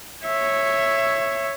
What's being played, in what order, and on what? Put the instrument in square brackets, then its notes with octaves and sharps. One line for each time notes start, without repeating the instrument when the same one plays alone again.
[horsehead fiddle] C#5 E5